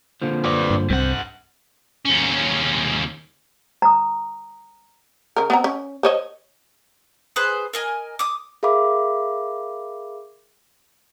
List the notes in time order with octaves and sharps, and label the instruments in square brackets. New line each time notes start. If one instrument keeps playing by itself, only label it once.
[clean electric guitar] A#2 D3 F3
[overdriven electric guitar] B4 D5
[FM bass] G2
[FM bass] C2 [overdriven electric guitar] G2 F#5 [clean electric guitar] C4
[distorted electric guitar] D#2 C#4
[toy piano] A#5 D#6
[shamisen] C#3 A#4
B3 C4 A#5
C#4
C5 C#5 D#5
[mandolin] G#4 B4 C5 F#6
A#4 D#5 G#5
D6 D#6
[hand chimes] G#4 A#4 E5 F5 B5 D6